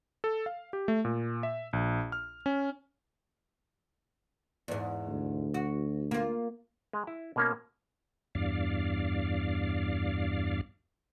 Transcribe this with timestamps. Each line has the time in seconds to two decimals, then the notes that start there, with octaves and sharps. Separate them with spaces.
0.24 A4
0.46 F5
0.73 G4
0.88 A3
1.05 A#2
1.43 E5
1.73 A#1
2.12 F6
2.46 C#4
4.68 E2 G#2
5.08 D2
5.54 F#4
6.11 A#3 F4
6.93 G#3
7.07 E4
7.36 B2 A#3 C#4
8.35 E2 G2 D5 F5